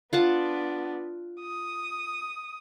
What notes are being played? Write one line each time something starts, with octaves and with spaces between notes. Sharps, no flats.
B3 D4 F4 F#5 A5
D#6